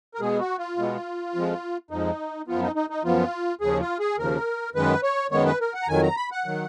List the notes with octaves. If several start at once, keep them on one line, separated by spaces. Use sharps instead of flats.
A#4
B2 G#3 B3 G#4
F#4
F4
B2 G#3 B3
F2 F3 G#3
F2 F3 G#3 D#4
F#2 F3 B3 F4
D#4
D#4
D#4
F#2 F3 B3 F4
D#2 C#3 F3 G#4
F4
G#4
D#2 C#3 F3 A#4
F#2 D#3 G#3 B3 B4
C#5
F#2 D#3 G#3 B3 C#5
B4
A#4
F#5
A#5
F2 D#3 F#3 G#5
A#5
B5
F#5
D#3 F#3